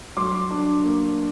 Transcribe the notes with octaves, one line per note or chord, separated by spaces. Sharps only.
F#3 C6 D6
D4
A#3